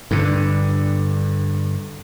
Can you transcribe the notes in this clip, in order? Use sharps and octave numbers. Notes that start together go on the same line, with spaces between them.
G2 D3